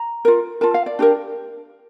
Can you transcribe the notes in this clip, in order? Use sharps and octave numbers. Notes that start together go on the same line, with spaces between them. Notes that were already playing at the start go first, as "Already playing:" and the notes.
Already playing: A#5
F4 A#4
F4 A#4 A5
F5
D5
D4 G4 A#4